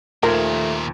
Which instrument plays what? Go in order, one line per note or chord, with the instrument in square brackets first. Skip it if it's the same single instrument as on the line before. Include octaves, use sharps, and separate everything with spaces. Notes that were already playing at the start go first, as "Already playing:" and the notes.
[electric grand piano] D#2 F4 G#6 [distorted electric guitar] A#2 D#3 [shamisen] F3 A#4 [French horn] A3